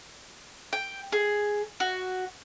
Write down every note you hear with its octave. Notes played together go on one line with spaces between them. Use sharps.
G5
G#4
F#4